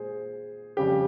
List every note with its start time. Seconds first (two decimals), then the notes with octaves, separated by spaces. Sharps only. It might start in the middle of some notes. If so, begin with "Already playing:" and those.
Already playing: A#2 G#3 G#4 C5
0.77 F2 C#3 G3 G4